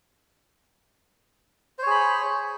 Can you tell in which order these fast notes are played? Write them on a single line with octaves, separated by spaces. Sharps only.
C5 C#5 G#4 B5